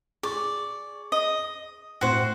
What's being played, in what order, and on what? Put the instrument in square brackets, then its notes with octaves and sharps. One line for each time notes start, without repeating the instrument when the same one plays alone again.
[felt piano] G#4 C#6 [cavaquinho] D5
[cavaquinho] D#5
[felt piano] A2 C4 [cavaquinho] F#4 C5